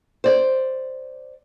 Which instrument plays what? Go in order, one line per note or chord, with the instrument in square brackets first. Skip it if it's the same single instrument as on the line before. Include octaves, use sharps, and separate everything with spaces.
[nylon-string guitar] C5 D5